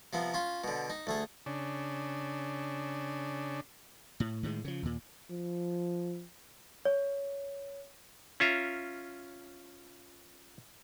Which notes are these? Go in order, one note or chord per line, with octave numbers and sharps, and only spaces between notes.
C3 F3 B3
C#4 F4
B2 D3
D#4
D2 A3 G#4
C#3 D4
A2
A2 D#3 F3 G#3
C#3 F3
D#2 A#2
F3
C#5
C#4 F4 E5 A#5